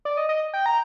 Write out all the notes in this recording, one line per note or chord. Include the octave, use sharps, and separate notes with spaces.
D5
D#5
D#5
G5
A#5